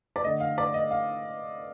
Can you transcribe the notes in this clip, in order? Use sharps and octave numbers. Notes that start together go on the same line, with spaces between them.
D5
D3 A3 D#5
F5
D5
D#5
F5